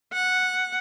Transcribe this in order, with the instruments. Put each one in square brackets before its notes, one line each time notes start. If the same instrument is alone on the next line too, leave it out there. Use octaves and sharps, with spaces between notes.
[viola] F#5